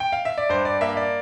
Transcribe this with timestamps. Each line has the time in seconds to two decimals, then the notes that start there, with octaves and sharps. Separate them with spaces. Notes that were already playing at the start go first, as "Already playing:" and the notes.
0.00 G5
0.12 F5
0.25 E5
0.38 D5
0.49 G2 C5
0.65 D5
0.81 A#3 E5
0.97 D5